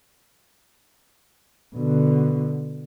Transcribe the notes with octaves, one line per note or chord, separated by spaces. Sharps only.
B2 D3